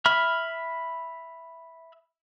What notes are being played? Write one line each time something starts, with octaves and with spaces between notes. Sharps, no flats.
E5 B5 F6